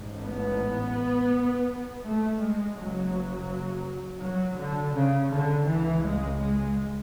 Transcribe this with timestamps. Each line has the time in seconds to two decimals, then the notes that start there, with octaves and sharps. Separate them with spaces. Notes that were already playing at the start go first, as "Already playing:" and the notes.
Already playing: A1 G#2
0.25 B3
2.05 A3
2.42 G#3
2.78 F#1 F#2 C#3 F#3
4.22 F#3
4.59 D3
4.95 C#3
5.31 D3
5.67 C#2 C#3 E3
6.03 G#3
6.39 G#3